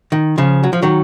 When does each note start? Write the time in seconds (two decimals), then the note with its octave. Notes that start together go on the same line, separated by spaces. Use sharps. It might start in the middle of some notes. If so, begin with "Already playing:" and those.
0.12 D#3
0.38 C#3 F3
0.64 F#3
0.73 F3
0.82 D#3 F#3